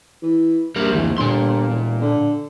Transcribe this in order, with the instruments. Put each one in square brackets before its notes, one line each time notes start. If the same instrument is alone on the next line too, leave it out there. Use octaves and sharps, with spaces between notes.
[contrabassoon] E3
[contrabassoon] A#1 [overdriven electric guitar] G3 A#4
[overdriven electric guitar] D2 E3
[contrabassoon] G1 [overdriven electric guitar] A#2 C6
[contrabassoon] E1
D3